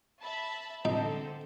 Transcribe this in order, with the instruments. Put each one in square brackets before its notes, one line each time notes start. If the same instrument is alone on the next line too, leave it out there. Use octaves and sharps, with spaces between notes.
[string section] E5 A5 B5
[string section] D3 C4 A4 [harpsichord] D#4